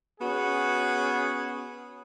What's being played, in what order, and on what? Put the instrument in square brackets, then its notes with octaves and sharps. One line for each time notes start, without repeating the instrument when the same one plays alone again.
[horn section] B3 C#4 F#4 G#4